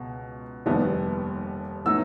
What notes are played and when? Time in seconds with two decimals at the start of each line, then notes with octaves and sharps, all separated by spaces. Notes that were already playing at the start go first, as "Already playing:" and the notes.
Already playing: C#2 B2
0.66 F1 D#2 D#3 G3 B3
1.85 A2 F#3 B3 D#4 E6